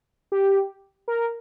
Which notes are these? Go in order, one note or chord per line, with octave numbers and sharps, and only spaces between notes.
G4
A#4